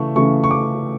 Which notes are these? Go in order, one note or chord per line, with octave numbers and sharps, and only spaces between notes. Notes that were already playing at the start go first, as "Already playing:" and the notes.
Already playing: C#3 E3 A3 C#6
C#3 E3 A3 C#6
C#6
D6